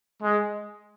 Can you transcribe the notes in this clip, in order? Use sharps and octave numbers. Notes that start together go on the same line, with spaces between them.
G#3